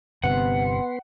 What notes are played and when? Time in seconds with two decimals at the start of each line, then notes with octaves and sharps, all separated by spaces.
0.24 G1 C3 B3 B4 F#5 C6